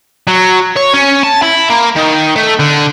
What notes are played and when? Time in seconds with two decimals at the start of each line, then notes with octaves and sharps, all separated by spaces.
0.28 F#3
0.77 C#5
0.94 C#4
1.24 A5
1.43 E4
1.70 A#3
1.96 D#3
2.36 A3
2.59 D3